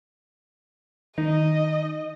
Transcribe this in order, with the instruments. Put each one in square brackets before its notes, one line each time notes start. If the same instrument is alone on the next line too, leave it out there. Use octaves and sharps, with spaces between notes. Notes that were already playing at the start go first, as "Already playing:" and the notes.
[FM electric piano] D#3 [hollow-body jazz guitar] D#4 [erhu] D#5